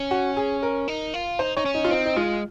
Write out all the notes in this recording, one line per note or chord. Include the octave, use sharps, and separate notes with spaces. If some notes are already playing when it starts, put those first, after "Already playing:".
Already playing: C#4
F#4
G#4
A#4
D#4
F4
D#4 C5
D#4 C#5
C#4
D#4
F4
C4 D#4
D#4
G#3 F4